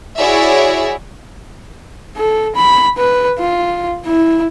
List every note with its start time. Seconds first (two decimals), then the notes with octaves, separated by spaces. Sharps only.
0.17 E4 F#4 G#4 C#5 D5 E5
2.18 A4
2.56 B5
2.98 B4
3.40 F4
4.06 E4